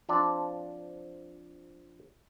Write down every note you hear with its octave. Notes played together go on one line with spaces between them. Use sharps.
F3 C4 D4 D5